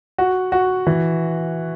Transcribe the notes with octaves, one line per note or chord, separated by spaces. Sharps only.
F#4
F#4
E3